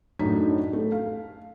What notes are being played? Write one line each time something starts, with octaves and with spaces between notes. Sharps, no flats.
F#2 A2 F#3 D4 D#4 B6
A3
F5